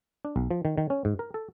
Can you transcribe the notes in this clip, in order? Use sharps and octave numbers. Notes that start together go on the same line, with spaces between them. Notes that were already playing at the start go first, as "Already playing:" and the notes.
D4
B1
F3
D#3
D#3
C#4
G#2
A#4
A4